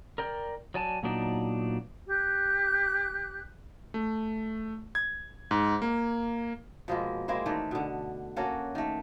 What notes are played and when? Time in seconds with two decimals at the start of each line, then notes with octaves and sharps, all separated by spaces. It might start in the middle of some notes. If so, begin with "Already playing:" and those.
0.18 A#4 D5 G5
0.74 F#3 D5 G#5 A5
1.03 A#2 F#3 B3 D4 D#4 D5
2.09 G4 F#6
3.94 A3
4.95 G#6
5.51 G#2
5.82 A#3
6.88 B2 F3 G#3 A#3
7.28 G#3 A#3 C4 E4
7.46 D#3 E3 A3 D5
7.71 B2 D3
8.36 A#3 C#4 F#4 A4
8.75 D#3 A3